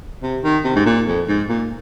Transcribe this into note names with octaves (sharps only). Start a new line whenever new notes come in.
C3
D#3
C3
G#2
A#2
F2
G#2
A#2